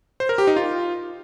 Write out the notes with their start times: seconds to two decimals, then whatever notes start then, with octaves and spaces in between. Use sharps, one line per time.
0.20 C5
0.29 A#4
0.38 G4
0.47 D#4
0.56 F4